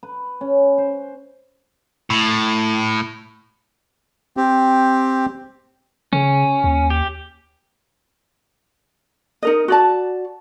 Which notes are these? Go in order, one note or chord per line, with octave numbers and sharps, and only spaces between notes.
B4
C#4
C5
A2
C4 G4
C#3 C#4
D#2
G4
D#4 A#4 D#5
F#4 D5 A5